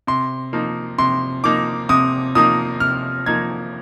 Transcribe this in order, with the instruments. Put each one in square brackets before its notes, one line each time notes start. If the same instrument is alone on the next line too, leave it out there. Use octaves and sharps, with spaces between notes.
[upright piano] C3 C6
F3 A#3 D#4
C3 C6
F3 A#3 D#4 D6
C3 D#6
F3 A#3 D#4 D#6
C3 F6
F3 A#3 D#4 G#6